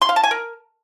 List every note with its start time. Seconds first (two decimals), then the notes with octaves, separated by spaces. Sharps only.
0.02 C6
0.09 F5
0.16 A5
0.24 G#5
0.31 A#4